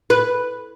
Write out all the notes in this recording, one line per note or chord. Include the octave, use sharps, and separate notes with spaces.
B4